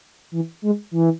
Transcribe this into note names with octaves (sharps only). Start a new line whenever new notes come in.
E3
G#3
E3